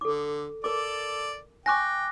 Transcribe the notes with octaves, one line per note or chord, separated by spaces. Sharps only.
D3 A4 D6
A4 A#4 D5 D6
G5 G#5 C#6 D6 F#6 A#6